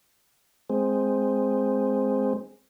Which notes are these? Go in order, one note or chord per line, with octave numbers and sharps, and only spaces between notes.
G#3 C4